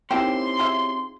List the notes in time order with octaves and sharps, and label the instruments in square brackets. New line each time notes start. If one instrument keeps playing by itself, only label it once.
[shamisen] A#3 G5 [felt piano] C4 D#4 [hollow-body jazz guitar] C#4 E4 G4 [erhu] C6
[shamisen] F4 G#4 E5